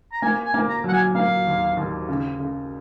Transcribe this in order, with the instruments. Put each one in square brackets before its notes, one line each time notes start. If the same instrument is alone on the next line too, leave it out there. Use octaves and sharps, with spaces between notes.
[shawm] A#5
[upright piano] A#3 [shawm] G#5
[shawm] G#5
[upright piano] A#3
[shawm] A#5
[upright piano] F#3 [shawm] F#5
[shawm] G#5
[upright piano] A#3 [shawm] F5
[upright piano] D#2
D#2
C#3
C#3